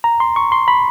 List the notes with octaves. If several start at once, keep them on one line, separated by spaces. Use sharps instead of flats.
A#5
C6
C#6
C6
B5